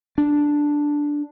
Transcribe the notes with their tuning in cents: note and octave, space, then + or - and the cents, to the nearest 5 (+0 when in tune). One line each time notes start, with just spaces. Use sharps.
D4 +0